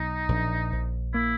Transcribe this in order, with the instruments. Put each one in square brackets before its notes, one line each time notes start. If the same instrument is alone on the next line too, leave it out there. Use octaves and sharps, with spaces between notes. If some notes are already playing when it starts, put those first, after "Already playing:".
Already playing: [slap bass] B1 [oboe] D#4
[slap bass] A#1
A#1
[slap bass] A#3 [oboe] E4